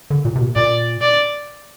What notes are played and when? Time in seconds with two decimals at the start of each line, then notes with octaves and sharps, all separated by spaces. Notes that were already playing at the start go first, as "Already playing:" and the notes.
0.10 D3
0.25 A#2
0.36 C3
0.41 A#2
0.56 A#2 D5
1.02 D5